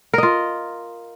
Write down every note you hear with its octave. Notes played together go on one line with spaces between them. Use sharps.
F4 A#4 D#5